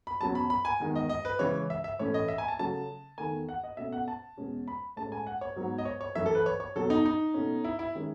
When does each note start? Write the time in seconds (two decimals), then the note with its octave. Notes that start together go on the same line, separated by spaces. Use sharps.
0.07 B5
0.21 E2 B2 F#3 C#4 A5
0.35 B5
0.50 B5
0.65 G#5
0.80 E2 D#3 G#3
0.95 D#5
1.10 D#5
1.25 B4
1.39 C#3 E3 G#3 C#4 C#5
1.70 E5
1.84 E5
1.99 A2 E3 A3 C#4 C#5
2.14 D#5
2.28 E5
2.38 G#5
2.48 A5
2.59 C#3 F#3 A3 C#4 A5
3.18 E2 D#3 A3 G#5
3.49 F#5
3.63 D#5
3.77 B2 A3 C#4 E5
3.92 F#5
4.08 A5
4.37 E2 B2 G#3 C#4
4.68 B5
4.97 A2 G#3 C#4 A5
5.12 G#5
5.27 F#5
5.41 C#5
5.56 G#2 F#3 B3
5.78 D#5
5.85 C#5
6.01 C#5
6.15 F#2 E3 A3 C#4 E5
6.26 A4
6.35 B4
6.46 C#5
6.60 C#5
6.75 E2 B2 F#3 A4
6.90 D#4
7.06 D#4
7.34 B2 A3 C#4
7.64 E4
7.79 E4
7.95 D#3 G#3 C#4